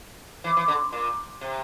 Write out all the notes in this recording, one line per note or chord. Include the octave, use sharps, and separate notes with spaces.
E3
E3
D3
A#2
C3